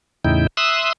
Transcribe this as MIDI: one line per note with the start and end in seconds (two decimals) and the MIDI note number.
0.25 0.47 40
0.25 0.47 45
0.25 0.47 49
0.25 0.47 63
0.25 0.47 64
0.25 0.47 79
0.57 0.93 76
0.57 0.93 84
0.57 0.93 87
0.57 0.93 88
0.57 0.93 90